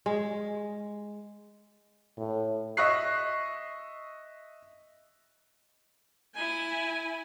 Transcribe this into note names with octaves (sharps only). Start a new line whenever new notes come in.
G#3
A2
D#5 E5 C#6 F#6 C7
E4 G#5